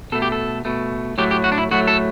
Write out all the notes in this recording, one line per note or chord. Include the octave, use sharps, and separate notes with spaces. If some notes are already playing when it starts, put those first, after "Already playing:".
B2 A3 A4
G4
A4
B2 A3
A2 F#3 A3 G4
G4
F#4
D4
E4
A2 F#3 A3 F#4
A4